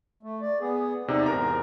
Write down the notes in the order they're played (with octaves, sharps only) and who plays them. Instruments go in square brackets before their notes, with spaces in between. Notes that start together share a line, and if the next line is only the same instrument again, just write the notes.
[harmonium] A3
D5
B3 G#4
[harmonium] E2 D5 [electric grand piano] C3 D#4
[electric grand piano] E2 A#4 A#5 [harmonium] G#2